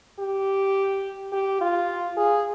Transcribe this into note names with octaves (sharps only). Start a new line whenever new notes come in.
G4
G4
F4
G#4